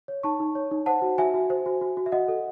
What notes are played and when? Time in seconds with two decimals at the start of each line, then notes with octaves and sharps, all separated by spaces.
0.08 C#5
0.23 D#4 A5 C#6
0.40 D#4
0.55 C#5
0.71 D#4
0.86 C5 F#5 A5
1.02 F#4
1.18 F#4 E5 G#5
1.34 F#4
1.50 C5
1.66 F#4
1.81 F#4
1.97 F#4
2.06 E5
2.12 F#4 D#5 F#5
2.28 A4